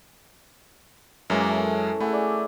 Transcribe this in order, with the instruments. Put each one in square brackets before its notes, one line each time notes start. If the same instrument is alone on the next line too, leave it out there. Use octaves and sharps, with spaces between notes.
[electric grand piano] F#2 G#3 [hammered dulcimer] E3 A#3 C#4
[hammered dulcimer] A4
[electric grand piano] A3 [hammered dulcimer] E4 G#4 F#5
[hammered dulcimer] D5